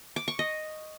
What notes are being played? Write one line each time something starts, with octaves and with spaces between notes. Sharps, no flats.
D6
C#6
D#5